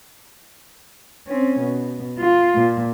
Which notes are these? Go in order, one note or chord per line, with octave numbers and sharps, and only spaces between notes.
C4 C#4
B2
F4
A#2